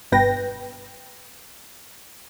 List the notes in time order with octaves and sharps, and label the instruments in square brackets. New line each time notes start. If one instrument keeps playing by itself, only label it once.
[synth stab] G1 G2 B2 B4 G5 A#6